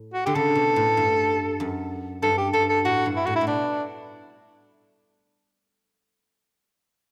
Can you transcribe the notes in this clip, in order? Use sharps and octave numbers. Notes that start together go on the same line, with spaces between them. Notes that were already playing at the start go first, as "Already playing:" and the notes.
Already playing: A2
F#4
D3 G4
C#3 A4
B2
A2
G2
F#2
G2 A4
G4
G2 A4
A4
A2 F#4
G2
E4
A2 F#4
E4
A2
B2 D4